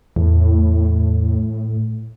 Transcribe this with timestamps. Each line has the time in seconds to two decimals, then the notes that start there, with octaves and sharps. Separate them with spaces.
0.16 E2 A2